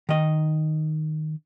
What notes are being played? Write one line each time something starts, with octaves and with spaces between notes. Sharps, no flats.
D#3 D#5